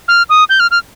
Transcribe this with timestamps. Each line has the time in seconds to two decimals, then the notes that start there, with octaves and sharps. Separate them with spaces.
0.08 F6
0.29 D#6
0.49 G6
0.60 F6
0.71 F6